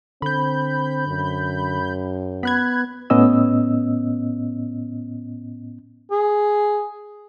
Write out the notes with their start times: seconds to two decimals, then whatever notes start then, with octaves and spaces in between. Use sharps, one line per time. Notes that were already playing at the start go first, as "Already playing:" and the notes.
0.22 D3 C4 B5 G6
1.07 F#2
2.43 B3 B5 F#6 G#6
3.10 A2 B3 C#4 D#5 E6
6.11 G#4